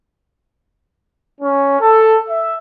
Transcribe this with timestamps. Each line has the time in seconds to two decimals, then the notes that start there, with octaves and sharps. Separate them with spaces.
1.41 C#4
1.80 A4
2.29 E5